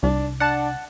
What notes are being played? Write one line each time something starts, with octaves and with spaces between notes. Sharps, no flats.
C2 D4
D4 F#5 A5